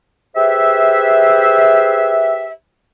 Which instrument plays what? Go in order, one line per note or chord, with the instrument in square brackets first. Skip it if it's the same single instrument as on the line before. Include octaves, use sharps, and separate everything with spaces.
[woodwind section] G4 G#4 B4 C5 E5